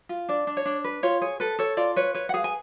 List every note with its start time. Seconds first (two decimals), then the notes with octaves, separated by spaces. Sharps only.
0.09 F4
0.29 D4 D5
0.47 D4
0.57 C#5
0.65 D4
0.84 B4
1.03 F4 C#5
1.22 G#4 C#5
1.40 A4 B4
1.59 A4 C#5
1.77 F4 D5
1.96 B4 C#5
2.14 B4 C#5
2.29 F#5
2.34 G#4 F5
2.44 G#5